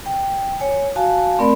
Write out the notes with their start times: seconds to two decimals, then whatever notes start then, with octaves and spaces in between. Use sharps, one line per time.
0.06 G5
0.60 C#5 G#5
0.96 F#4 F5 G#5 A5
1.39 A3 C4 A#4 D5 B5